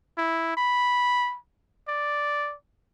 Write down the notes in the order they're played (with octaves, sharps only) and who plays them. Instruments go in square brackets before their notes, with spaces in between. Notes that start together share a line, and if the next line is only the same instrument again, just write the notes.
[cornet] E4
B5
D5